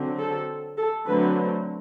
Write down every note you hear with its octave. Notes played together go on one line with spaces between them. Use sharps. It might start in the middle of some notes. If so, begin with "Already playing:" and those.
Already playing: D3 F#3 C4
A4
A4
D3 F#3 A3 C4 B4